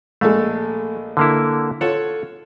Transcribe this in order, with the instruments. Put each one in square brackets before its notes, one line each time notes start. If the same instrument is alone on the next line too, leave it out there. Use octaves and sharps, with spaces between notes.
[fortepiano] A#1 G#3 A4 [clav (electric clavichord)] A3
[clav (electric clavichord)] D3 A#3 E4
[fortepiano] F4 C#5 [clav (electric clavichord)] A4 F#5